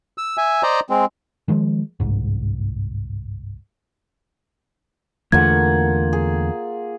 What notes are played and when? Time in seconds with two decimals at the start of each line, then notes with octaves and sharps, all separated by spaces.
0.18 E6
0.38 E5 G#5
0.63 C5 D5 D#5 A#5
0.90 G#3 C4
1.48 D#3 F3 G#3
2.00 G1 C2 G#2
5.32 E2 D3 A3 A#3 F4 F#5 G#6
6.13 G#4